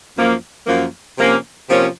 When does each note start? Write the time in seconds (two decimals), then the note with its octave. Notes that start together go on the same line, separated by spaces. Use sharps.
0.16 F#2 F3 A#3
0.67 F#2 F3 A#3
1.17 C3 F3 A#3 C#4
1.68 C3 F3 A#3 C#4